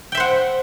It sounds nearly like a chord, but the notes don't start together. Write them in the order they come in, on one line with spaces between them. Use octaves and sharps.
G5 E5 C5 F#5